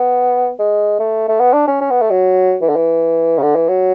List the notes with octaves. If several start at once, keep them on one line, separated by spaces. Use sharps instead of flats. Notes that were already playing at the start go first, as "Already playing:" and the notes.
Already playing: B3
G#3
A3
A3
B3
D4
C#4
C#4
B3
A3
F#3
E3
D3
E3
C#3
D3
E3
F#3